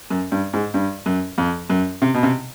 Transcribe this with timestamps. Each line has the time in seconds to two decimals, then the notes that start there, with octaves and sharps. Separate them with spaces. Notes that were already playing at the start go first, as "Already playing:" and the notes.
0.10 F#2
0.32 G2
0.53 G#2
0.74 G2
1.06 F#2
1.38 F2
1.70 F#2
2.02 C3
2.14 B2
2.23 C3